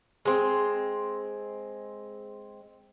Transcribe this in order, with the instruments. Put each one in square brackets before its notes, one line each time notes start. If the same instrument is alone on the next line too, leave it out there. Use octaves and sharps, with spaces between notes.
[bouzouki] G#3 C4